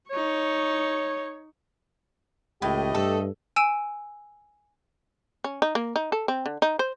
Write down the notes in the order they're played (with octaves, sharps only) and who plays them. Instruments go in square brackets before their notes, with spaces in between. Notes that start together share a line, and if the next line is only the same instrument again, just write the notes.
[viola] D#4 C#6 [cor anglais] C#5
[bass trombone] C#2 [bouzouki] A2 [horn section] A3 G4 D#5
[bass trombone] G2 [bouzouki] A4
[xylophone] G#5 E6 D7 E7
[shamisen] C#4
D#4
A#3
D#4
A4
C4
D3
D#4
C5